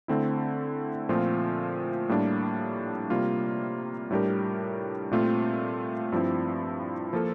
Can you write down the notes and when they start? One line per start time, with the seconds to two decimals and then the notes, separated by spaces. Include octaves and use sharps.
0.08 D3 A3 C4 E4
1.09 A#2 F3 A3 C4 F4
2.09 A2 G3 A#3 D4
3.10 C3 G3 A#3 F4
4.10 A2 G3 D4 G4 A#4
5.11 A#2 A3 C4 F4
6.12 G2 F3 C4 E4
7.13 F3 A#3 F4 A4